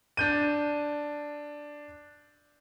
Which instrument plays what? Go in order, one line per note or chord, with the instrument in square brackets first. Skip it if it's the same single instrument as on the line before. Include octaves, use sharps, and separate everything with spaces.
[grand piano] D4 G6 D#7